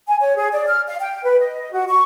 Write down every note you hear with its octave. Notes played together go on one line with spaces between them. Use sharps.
G#5
C#5
G#4
D5
F6
F5
G5
B4
D#5
F#4
C#6